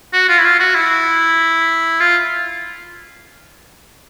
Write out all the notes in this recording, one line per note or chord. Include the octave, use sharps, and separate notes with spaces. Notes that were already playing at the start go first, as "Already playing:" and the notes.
F#4
F4
E4
F4
F#4
E4
F4